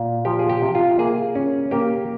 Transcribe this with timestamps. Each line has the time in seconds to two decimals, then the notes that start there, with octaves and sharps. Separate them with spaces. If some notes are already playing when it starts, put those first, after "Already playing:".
Already playing: A#2
0.25 F3 G4
0.39 G#4
0.49 G4
0.62 C3
0.75 F4
0.99 A#3 G#4
1.35 C#4
1.71 A#3 G4